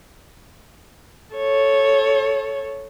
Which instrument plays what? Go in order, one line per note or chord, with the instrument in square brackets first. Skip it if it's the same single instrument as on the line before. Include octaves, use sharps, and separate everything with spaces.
[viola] A4 C#5